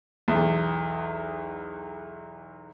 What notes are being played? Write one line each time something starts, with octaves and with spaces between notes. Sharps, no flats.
B1 E2